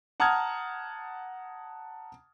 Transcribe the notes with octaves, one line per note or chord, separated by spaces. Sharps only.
F#5 A5 A#5 D#6 F6 G#6